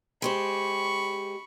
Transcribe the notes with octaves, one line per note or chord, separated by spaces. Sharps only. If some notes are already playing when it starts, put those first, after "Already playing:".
G#3 G4 C5 B5 C#6